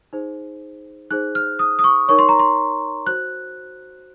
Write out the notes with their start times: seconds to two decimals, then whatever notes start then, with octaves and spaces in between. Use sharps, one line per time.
0.13 D#4 G#4 C5
1.10 D#4 G#4 C5 F#6
1.35 F6
1.59 D#6
1.79 D#6
1.84 C#6
2.08 D#4 A#4 C#5 C#6
2.19 C6
2.29 A#5
2.39 C6
3.06 F#4 C5 F#6